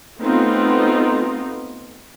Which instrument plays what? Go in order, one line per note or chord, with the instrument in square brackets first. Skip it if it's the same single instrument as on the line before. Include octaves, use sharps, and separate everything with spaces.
[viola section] A3 B3 C4 D#4 F4